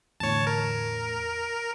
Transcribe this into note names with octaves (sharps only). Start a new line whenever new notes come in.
E2 A2 D3 C#5 A5
A#4